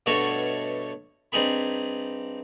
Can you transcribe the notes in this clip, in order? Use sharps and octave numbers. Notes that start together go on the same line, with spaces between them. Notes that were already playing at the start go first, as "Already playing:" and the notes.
G2 B2 A3 F#4 C#5 E5
G2 C4 D#4 G#4 B5